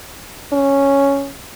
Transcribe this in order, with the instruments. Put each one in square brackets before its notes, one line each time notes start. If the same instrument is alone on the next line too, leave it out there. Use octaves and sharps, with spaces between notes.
[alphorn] C#4